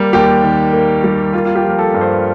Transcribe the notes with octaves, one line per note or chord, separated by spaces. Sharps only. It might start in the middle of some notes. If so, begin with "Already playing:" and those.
Already playing: G3 A#3
D#2 G4
D#3
A#3
G3
A#3 F4
F4
G4
F3
A#4
A4
G2
C5